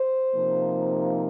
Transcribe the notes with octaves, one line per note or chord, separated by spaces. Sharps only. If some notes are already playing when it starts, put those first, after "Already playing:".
Already playing: C5
C3 F3 A#3 D#4